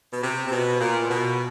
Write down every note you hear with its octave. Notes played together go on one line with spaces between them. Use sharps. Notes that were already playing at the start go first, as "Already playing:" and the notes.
B2
C3
C3
B2
A#2
B2